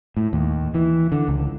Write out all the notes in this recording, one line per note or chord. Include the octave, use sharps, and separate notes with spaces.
A2
D#2
E3
D3
C#2